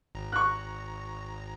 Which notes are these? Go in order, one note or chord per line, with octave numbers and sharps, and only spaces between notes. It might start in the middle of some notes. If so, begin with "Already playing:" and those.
G#1 A#5
C#6 F#6